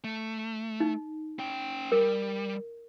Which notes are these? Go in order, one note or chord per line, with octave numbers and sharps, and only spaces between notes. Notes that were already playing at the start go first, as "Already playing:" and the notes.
A3
D#4
C#4 G5
G3 A#4